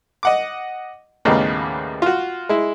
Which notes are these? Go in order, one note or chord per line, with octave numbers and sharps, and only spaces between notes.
D#5 F#5 D6
D#2 A2 C#3 G3 A#3 B3
F4 F#4
G#3 E4